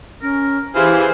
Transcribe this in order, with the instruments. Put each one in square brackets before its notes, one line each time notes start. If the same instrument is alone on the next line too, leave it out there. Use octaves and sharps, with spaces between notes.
[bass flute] C#4 [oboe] A#4
[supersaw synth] E3 [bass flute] G4 [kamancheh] G#4 C5 [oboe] F5